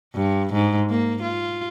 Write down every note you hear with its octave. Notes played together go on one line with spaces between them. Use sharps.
G2
G#2
A#3
F4